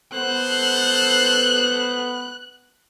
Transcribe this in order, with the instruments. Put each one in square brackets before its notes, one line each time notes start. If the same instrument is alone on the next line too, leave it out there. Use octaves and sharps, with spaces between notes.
[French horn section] B3 [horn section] A4 C5 [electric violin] F#6